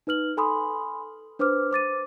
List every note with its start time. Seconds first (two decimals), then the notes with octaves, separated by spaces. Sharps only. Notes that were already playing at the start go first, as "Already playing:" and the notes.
0.07 D#4 B4 F6 F#7
0.37 A4 G#5 B5 C6 D#6
1.39 D4 B4 C5 D6 F6
1.71 C5 D6 A6 D#7